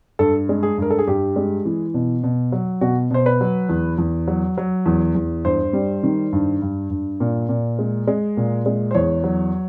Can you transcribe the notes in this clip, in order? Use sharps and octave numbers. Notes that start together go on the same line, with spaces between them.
G2 A4
G#3
G#4
G2 A#4
A4
G#4
G2 G4
G#3
E3
B2
B2
F#3
B2 F#4
B2 C5
B4
F#3
E2
E2
F#3
F#3
E2
E2
G2 C5
G3
D#3
G2
G2
G2
A#2
A#2
G#3
G#3
A#2
G#3
C5
E2 C#5
F#3